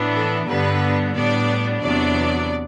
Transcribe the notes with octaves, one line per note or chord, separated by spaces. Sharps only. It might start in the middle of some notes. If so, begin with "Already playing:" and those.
Already playing: A2 E3 B3 D4
A4
G2 D3 G3 B3 D4 B4
A2 G3 B3 D4 D5
E2 C3 F#3 B3 D4 D5